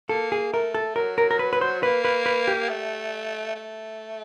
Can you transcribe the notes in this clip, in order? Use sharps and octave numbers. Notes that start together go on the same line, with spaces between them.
A#3 A4
G#4
A3 A#4
A4
F#3 A#4
A#4
A#4
B4
B4
C5
A#3 B4
B4
B4
G4
A3
A3